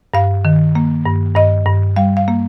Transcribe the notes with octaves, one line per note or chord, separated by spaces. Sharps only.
G2 F5
D#3
A#3
G2
G2 D#5
G2
G3 F5
F5
A#3